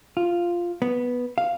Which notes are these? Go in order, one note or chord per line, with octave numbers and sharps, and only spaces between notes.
F4
B3
F5